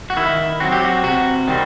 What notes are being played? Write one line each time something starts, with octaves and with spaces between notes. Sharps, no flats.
F#4
D#3 E4
F#3 C4 F#4
G4
F#4
C3 F#4
D#3 G3 C4